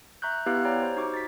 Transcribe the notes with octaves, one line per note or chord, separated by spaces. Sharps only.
E5 A#5 C#6 F#6 G6
B3 E4 G4 B4 F5 F#6
C#5 D5 G5 A#5
G4 C5
D#4 F#4 C#6 D6
A6 B6